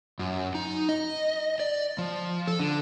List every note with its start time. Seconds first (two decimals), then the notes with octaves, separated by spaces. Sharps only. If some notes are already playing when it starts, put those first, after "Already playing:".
0.19 F#2
0.55 D#4
0.89 D#5
1.60 D5
1.98 F3
2.47 A4
2.59 D3